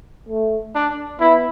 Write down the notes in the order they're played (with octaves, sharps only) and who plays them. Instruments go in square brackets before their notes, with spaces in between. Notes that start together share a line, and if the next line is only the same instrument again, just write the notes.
[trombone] A3
[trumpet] D4
[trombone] B3 [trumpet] E4